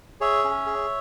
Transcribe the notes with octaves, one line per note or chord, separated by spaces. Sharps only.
G#4 C#5 E5
C#4
G#4